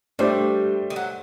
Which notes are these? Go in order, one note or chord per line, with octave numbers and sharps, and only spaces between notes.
G3 A3 D4 A4 C5
D#3
F#3